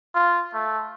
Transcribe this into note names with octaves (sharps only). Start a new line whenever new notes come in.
F4
A3